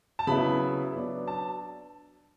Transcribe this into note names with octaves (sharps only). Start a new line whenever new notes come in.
A5
C#3 F#3 B3 E4 B5
F#3 B3 D4
A5